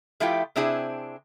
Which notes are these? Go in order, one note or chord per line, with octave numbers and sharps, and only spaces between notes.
F3 A3 E4 F4 G4 G5
C3 C4 D4 E4 G#4